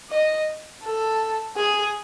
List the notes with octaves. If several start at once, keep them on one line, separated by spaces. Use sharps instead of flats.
D#5
A4
G#4